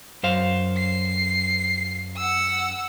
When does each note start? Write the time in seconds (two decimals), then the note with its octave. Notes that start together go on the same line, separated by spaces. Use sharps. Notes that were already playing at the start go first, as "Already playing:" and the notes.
0.23 F#2 C5 F5
0.77 C7
2.17 F#5 E6